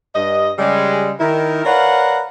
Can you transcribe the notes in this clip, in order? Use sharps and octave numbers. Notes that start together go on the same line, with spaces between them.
G2 D#5
C#3 G3 G#3
D#3 E4 A#4
A#4 B4 C#5 D5 F5 F#5